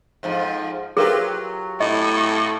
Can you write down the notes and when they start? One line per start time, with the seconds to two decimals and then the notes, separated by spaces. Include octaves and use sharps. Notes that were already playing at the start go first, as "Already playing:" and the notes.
0.23 F2 G#2 F3
0.97 F#3 F4 G4 G#4 A#4 B4
1.80 A2 D#5